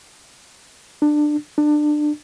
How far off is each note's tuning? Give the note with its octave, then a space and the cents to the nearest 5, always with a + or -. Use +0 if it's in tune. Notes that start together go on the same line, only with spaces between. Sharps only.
D4 +20
D4 +25